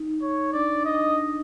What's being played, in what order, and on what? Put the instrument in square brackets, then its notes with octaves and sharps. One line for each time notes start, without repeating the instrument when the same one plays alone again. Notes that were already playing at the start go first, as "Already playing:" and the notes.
Already playing: [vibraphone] D#4
[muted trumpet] C#5
[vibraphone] D4 [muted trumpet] D5
[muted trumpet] D#5